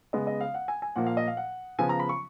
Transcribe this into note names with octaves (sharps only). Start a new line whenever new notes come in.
C#3 G#3 B3 D#5
D#5
F5
F#5
G#5
G#5
A#2 F3 A#3 F#5
F5
D#5
F5
F#5
C#3 F3 B3 G#5
A#5
B5
C#6